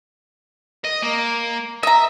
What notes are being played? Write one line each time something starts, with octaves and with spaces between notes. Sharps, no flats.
D#5
A#3
D#5 E5 A#5